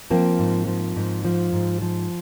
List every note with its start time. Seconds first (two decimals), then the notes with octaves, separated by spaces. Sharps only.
0.10 F3 A#3 C4
0.39 G#2
0.67 F3
0.96 G#2
1.25 F3
1.53 G#2
1.82 F3